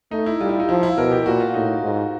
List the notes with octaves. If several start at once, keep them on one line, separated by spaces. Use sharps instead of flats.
A3 D#4
E4
G3 F4
E4
D#4
F3 E4
E4
B2 A#4
G4
A#2 F#4
F4
A2 D#4
G#2